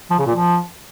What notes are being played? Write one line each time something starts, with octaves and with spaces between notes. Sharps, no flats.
F3
C#3
A#2
F3